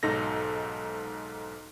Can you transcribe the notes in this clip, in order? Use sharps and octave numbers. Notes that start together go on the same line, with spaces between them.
B1 G#2 D#4 A4 A#6